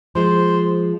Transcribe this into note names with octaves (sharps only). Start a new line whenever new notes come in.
F3 G#3 C5